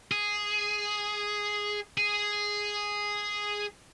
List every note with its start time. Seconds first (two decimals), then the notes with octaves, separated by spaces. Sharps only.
0.12 G#4
1.98 G#4